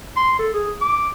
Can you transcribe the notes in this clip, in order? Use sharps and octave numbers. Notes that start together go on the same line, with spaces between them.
C6
A4
G#4
D6